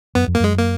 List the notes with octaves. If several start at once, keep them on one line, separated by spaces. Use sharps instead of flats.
F#2 B3
F2
A#3
F#2 G#3
A#3